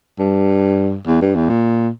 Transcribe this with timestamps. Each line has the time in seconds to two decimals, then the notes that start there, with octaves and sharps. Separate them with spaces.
0.19 G2
1.07 E2
1.21 G2
1.35 E2
1.50 A#2